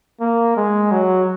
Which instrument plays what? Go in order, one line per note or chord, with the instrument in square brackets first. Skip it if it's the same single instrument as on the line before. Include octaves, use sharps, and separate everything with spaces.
[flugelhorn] A#3
G#3
F#3